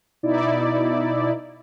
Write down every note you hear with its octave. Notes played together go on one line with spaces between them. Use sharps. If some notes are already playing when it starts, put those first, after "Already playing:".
B2 D#4 E4 D5